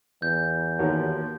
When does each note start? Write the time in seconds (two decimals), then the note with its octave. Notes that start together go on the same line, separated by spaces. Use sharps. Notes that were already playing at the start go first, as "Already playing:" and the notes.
0.22 E2 G6
0.79 D#2 D#3 F#4 A#4 C#5